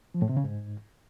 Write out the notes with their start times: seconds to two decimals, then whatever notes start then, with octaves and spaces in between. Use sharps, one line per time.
0.14 F3
0.22 A2
0.29 C3
0.37 C#3
0.44 G#2